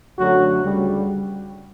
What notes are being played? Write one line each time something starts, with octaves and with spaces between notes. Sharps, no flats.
F#2 D3 F#3 A3 F#4
D2 C#3 G3